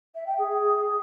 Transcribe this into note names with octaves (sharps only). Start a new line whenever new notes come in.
E5
G5
G#4